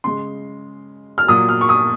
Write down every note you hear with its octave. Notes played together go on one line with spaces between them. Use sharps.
C#3 G#3 C6
F6
A#2 F#3 A#3 D#6
F6
C#6
D#6